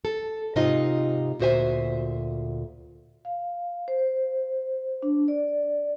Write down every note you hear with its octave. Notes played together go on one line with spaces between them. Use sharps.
A4
G#2 C3 D#4 F4 D#5
D2 A#2 F#4 C5 E5 G#5
F5
C5
D4
D5